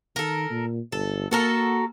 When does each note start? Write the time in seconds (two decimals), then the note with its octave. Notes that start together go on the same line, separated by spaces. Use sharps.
0.16 D#3 A4 A#4
0.50 A#2
0.92 G1 A4
1.31 A#3 F#4 A4 A#4